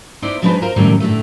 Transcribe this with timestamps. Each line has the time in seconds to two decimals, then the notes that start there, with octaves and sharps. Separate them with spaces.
0.22 B3 D#4 E4 C5 D5
0.42 F3 G#3 D4 D#4 B4 C5
0.62 F4 A#4 C5
0.76 F#2 A2 C3 D#3 F#3 G3
1.00 A2 D3 A3